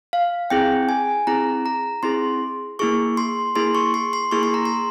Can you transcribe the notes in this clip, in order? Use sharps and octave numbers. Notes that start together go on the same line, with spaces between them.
F5
C4 E4 G#4 G5
G#5
C4 E4 G#4 A#5
A#5
C4 E4 G#4 C6
A#3 E4 G#4 C#6
C6
A#3 E4 G#4 C6
C#6
C6
C6
A#3 E4 G#4 C#6
C6
A#5
C6